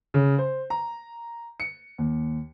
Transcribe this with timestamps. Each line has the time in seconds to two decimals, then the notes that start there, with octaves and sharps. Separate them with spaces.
0.14 C#3
0.38 C5
0.70 A#5
1.60 C#7
1.98 D#2